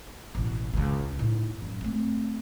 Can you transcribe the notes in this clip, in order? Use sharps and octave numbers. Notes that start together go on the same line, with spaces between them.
A1 B2
C#2 C#3
A2 D#4
F#2
A3 C4